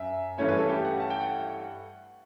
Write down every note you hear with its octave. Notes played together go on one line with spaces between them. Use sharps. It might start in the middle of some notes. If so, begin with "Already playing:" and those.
Already playing: F#2 E5
G2 E3 A3 C#4 E4 C#5
B4
A4
G4
F#5
A5
G5
F#5